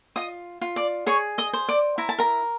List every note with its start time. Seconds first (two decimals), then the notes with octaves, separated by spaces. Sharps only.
0.16 F4 D#5 D#6
0.61 F4
0.76 D5 D6
1.07 G#4 C#5 C#6
1.38 D#5 D#6
1.53 C5
1.68 D5 D6
1.98 E4 A#5
2.09 A5
2.18 A#4 A#5